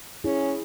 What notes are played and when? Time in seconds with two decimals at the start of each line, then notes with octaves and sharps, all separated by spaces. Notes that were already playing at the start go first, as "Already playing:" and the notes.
0.24 C#4 E4 G#4